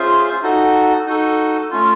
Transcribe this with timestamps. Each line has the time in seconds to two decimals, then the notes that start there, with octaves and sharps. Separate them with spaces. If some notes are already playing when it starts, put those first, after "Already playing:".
Already playing: C#4 F4 G#4 C5 E5
0.43 D#4 F#4 A4
1.06 D#4 F#4 A4
1.71 A3 C#4 F4